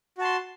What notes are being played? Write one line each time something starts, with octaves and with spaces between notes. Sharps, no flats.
F#4 A5 C6